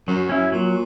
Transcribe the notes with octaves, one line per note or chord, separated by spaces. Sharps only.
F#2 F#3
C#4 E4
A#2 F#3